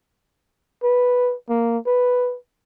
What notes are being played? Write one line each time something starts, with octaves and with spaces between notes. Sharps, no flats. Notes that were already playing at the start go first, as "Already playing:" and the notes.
B4
A#3
B4